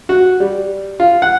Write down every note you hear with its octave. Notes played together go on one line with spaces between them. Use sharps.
F#4
G3
F4
F#5